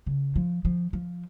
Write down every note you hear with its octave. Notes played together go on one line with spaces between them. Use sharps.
C#3
F3
F3
F3